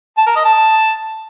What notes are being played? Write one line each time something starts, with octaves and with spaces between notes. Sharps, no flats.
A5
A#4
D#5
A5